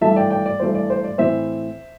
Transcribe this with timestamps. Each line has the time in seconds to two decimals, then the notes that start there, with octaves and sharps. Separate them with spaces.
0.01 G2 E3 A3 E5 A5
0.16 D5 G5
0.30 D5 G5
0.46 D5
0.60 G2 E3 A3 C5
0.75 D5
0.90 C5
1.04 D5
1.18 A2 E3 C4 C5 E5